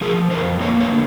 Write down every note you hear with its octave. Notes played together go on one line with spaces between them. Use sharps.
F3 G#4 A#4
F2 A#4 C5
A#3 B4 C#5
B4 C#5
D3